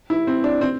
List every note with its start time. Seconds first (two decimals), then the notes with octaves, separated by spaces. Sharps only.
0.10 E4
0.27 C4
0.44 D4
0.61 C4